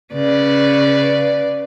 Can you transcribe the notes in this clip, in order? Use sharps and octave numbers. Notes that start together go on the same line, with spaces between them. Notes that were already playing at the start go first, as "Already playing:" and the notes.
C#3 B4 D5